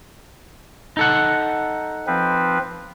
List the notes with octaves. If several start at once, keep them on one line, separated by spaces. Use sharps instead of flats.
D#4 A4 F#5
F3 C4 B4